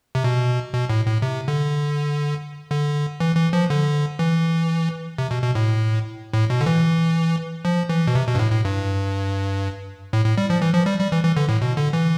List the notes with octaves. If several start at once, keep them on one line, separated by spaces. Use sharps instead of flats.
C3
B2
B2
A2
A2
C3
D3
D3
E3
E3
F3
D3
E3
C3
B2
B2
A2
A2
B2
D3
E3
F3
E3
B2
C3
B2
G2
A2
A2
G2
A2
A2
G3
F3
E3
F3
G3
G3
E3
E3
D3
A2
B2
D3
E3